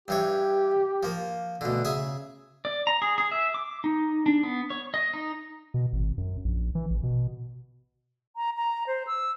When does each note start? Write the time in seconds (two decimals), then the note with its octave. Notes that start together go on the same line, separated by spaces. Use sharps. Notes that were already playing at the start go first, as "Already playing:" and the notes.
0.08 G2 E3 G4 C#5
1.03 F3 A#3
1.61 D2 B2 D3
1.85 C#3 G#4 E5
2.65 D5
2.87 A#5
3.02 G#4
3.18 G#4
3.32 E5
3.54 D6
3.84 D#4
4.26 D4
4.43 B3
4.70 C#5
4.94 D#5
5.14 D#4
5.74 B2
5.93 G#1
6.18 F#2
6.44 A#1
6.75 E3
6.90 A1
7.03 B2
8.36 A#5
8.56 A#5
8.87 C5
9.07 E6